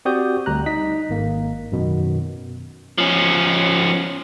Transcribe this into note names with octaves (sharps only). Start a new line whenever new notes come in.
C4 F#4 G4 D5 D#6 G6
D2 G3 A#5 F#6
D#4 D#5 B6
G#1 A#3
F#2 B2 D#3
F3 C#4